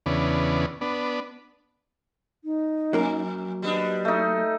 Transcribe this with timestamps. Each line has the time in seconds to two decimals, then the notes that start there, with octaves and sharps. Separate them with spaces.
0.06 E2 C#3 B3 D4
0.81 B3 D4
2.44 D#4
2.93 F2 F#3 A#3 A#4
3.62 G3 B3 D4 D#5
4.05 A3 D#4